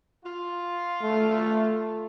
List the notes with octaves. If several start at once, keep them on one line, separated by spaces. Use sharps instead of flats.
F4
A3